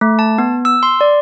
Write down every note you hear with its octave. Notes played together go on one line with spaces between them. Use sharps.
A3
A5
B3
E6
C6
D5